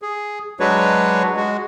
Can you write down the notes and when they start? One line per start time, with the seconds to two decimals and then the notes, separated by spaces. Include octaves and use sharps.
0.02 G#4
0.60 F#3 G#3 D4 F#4 B4 C#5
1.37 G#3 F#4